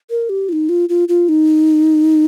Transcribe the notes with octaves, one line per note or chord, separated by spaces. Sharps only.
A#4
G4
F4
D#4
F4
F4
F4
D#4